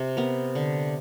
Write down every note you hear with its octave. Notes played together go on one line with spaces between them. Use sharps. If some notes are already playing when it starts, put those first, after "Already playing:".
Already playing: C3
B3 A#4
D3